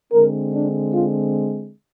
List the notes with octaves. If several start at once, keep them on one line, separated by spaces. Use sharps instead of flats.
D3 G#3 C4 A#4
D4
F4